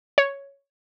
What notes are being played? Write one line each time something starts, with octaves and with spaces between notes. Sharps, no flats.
C#5